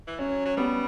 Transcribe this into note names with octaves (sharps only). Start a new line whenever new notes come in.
E3
F#3 C#4
F#3
G3 B3